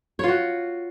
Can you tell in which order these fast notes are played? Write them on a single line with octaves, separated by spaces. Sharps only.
C#5 F4 F#4